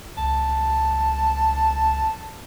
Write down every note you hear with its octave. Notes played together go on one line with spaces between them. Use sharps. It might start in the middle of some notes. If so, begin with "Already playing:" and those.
C#2 A5